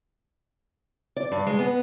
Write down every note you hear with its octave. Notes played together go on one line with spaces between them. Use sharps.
D5
G2
G#3
B3